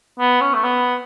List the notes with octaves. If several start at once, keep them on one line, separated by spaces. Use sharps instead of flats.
B3
C#4
A3
B3